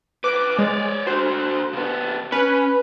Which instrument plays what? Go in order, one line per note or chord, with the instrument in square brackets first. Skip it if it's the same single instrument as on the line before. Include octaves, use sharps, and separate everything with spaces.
[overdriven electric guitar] C#2 B4 [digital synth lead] D6
[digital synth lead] G#3 [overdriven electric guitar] C#5 D5
[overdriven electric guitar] D3 F#4 [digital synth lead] C5
[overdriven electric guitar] C#3 B3
[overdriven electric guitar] C#4 [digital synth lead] B4